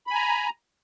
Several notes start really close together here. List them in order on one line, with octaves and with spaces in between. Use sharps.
B5 G#5 A#5